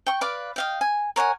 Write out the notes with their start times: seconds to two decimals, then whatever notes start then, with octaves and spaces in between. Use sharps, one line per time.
0.06 G5 C#6
0.21 B4 D5 F5 D6
0.56 D#5 F5 G5
0.81 G#5
1.16 A#4 C#5 F#5 G#5